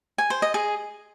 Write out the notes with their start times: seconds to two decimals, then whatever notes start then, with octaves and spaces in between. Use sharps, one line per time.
0.18 G#5
0.30 C5
0.42 D#5
0.54 G#4